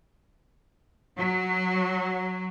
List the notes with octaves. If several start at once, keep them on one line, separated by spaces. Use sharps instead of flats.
F#3